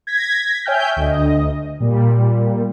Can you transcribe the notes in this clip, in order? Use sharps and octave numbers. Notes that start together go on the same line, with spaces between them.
G#6 A#6 B6
C#5 E5 G5 G#5 F6 G6
D2 D#5
A#2 G3